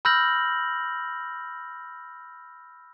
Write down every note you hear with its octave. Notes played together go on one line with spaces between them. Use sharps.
B5 E6 F6 G6 A#6 F#7